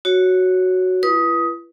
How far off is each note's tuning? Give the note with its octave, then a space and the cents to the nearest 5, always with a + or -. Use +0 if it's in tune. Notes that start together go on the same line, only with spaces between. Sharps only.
F#4 +0 C#5 +0
E4 +45 B4 -20 D#6 +15